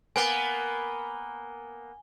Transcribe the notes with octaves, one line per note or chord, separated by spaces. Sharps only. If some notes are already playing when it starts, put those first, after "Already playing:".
A#3 B3 G#5 G7